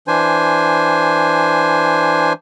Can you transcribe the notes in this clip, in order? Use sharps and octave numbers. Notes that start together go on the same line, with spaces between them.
E3 D4 C5 G#5